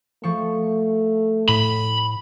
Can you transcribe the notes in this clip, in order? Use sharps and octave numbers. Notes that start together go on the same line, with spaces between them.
F3 A3 C#6
A2 B5